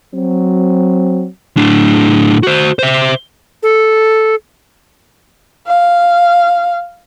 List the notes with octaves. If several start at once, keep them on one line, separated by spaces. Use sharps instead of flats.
F#3 C4
A2 D4
F#4 C5
C5 E5
A4
F5